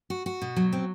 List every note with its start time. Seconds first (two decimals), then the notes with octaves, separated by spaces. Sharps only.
0.10 F#4
0.26 F#4
0.42 B2
0.56 F#3
0.73 C4